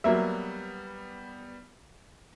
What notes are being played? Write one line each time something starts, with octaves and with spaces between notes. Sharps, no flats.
F#3 G3 A#3 B3 E5